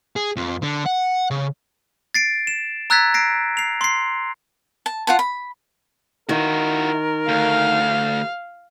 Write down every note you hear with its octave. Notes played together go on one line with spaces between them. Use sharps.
G#4
F2
D3
F#5
C#3
A6 C7 D7
E7
A#5 E6 F#6 G#6 A6 B6
A#6 C7 D7
C7 F7
C6 C7
A5
F4 F#5 A5
B5
D#3 E4 F#4 A#4
D2 F5